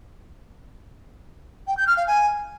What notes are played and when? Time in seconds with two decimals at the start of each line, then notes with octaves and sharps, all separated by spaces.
1.67 G5
1.77 G6
1.87 F6
1.97 F5
2.07 G#5